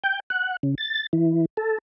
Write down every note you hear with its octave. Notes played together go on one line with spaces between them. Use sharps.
G5
F#5
C#3
A6
E3
A4